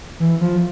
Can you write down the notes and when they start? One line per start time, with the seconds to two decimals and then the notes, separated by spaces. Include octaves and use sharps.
0.20 E3
0.41 F3